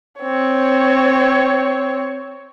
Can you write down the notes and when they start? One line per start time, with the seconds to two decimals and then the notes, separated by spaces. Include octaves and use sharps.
0.20 C4 C#5